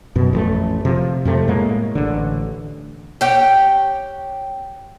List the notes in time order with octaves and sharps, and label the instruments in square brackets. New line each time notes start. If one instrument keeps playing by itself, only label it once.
[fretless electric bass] F#2 B2
A1 F2 A3
C3 F3
F2 C3 A3
A2 G#3 A#3
A1 D3
[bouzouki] G4 C#5 F#5 G5